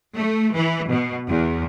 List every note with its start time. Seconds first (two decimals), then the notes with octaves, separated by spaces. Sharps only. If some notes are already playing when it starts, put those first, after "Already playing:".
0.16 A3
0.54 E3
0.90 B2
1.29 E2